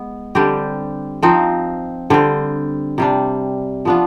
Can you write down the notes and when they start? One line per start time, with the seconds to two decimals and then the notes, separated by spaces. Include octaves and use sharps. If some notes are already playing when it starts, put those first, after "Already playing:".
Already playing: G#3 B3
0.35 D3 G3 C4 G4
1.23 F3 C4 D#4
2.10 D3 G3 C4
2.98 C3 G3 D4
3.85 F3 B3 D4 F4